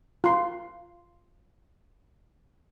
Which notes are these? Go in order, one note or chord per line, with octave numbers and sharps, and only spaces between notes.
F4 C6